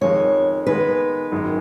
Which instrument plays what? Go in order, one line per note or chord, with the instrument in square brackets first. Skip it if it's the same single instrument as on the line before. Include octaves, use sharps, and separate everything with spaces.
[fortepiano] F2 D#3 G#3 [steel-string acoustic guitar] C#5
[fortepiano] D#3 G#3 B3 [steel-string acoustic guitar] B4
[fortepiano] G#1 F#2 D#3 G#3